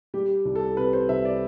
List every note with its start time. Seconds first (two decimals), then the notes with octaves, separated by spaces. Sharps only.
0.14 G3 G4
0.45 C2
0.56 A4
0.77 C3 B4
0.93 C5
1.09 C2 E5
1.25 D5